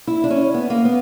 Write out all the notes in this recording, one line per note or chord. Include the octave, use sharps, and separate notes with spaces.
E4
D4
C#4
B3
A#3
B3